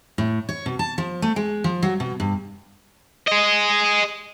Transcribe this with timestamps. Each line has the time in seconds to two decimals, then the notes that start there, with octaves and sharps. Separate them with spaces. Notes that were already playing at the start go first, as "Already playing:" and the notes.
0.18 A2
0.49 C#5
0.66 B2
0.79 A5
0.98 F3
1.22 A3
1.36 G#3
1.64 F3
1.83 F#3
2.00 B2
2.20 G2
3.28 G#4 D#5